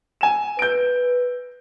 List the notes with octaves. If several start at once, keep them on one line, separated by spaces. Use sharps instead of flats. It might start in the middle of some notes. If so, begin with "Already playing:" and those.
G#5 E7
B4 G6 D7